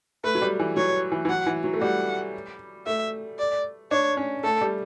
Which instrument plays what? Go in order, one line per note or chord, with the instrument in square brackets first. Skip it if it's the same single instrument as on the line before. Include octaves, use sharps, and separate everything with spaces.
[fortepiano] A3 [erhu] B4
[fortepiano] F#3
G3
E3
[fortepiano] F#3 [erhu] C#5
[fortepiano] E3
E3
[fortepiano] F#3 [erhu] F#5
[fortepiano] E3
F#3
A3
[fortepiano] G3 [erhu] F#5
[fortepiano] A3 [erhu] E5
[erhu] D5
[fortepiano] D4 [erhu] C#5
[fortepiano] C#4
[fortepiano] A3 [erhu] A4
[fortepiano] G3